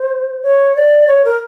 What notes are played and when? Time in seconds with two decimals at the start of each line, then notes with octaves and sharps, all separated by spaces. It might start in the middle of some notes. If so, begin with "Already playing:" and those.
Already playing: C5
0.43 C#5
0.76 D5
1.08 C#5
1.25 A#4